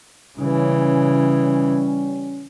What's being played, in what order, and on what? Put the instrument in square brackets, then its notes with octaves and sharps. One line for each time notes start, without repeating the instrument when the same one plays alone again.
[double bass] C#3 E3 [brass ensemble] G3 C#4